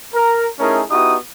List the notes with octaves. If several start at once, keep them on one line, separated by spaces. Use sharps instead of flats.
A#4
A3 C#4 D#4 E4 G#4 A#4
B3 D#4 E4 F#4 G4 D#6